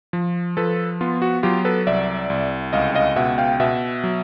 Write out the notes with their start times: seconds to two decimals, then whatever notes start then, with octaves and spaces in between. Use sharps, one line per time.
0.13 F3
0.57 F3 A4 B4
1.01 B3 F4
1.22 F#4
1.43 F#3 F4 G4
1.65 A4 B4
1.87 C2 D5 E5
2.30 C2
2.73 C#2 D#5 F5
2.95 D#5 F5
3.16 B2 E5 F#5
3.38 F5 G5
3.60 B2 E5 F#5
4.04 F#3